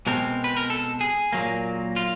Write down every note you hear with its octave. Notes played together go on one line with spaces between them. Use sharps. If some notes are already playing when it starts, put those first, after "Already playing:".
B2 G#3 C4 A#4
B4
A#4
A4
G#4
A#2 F#3 A#3
F4